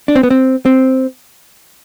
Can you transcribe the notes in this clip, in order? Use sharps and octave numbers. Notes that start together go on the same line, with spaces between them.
D4
C4
B3
C4
C4